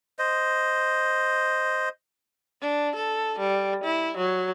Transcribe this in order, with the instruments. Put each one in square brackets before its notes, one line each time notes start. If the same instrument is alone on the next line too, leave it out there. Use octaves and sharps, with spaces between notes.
[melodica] C5 D#5
[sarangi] D4
A4
G3
E4
F#3